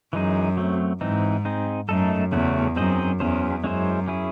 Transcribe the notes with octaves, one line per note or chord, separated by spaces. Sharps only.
F#2 E3 G#3 D#4 G#4
F#3 A3 C4
G#2 E3 C4 D#4
C4 D#4 G#4
F#2 A3 D#4 A4
E2 C#3 F#3 A3 C#4 F#4
F#2 C4 D#4 G#4 C5 D#5
E2 F#3 C#4 G#4 C5
F#2 G#3 C#4 E4 G#4 C5
C#4 E4 G#4